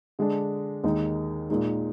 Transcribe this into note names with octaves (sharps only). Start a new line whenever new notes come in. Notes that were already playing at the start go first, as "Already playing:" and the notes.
D3 G#3 D4
D#2 D#3 G#3 D#4
A#2 G#3 D#4